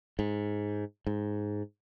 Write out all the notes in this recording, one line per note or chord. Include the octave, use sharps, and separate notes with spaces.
G#2
G#2